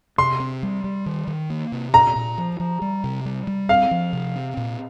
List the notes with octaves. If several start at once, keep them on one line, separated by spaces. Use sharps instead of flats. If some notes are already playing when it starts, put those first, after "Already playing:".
C3 C6
C4
G3
G3
D#3
D#3
A#3
C3
A#2 A#5
A#2
F3
F3
G3
C3
G3
G3
C4 F5
F3
C3
C4
A#2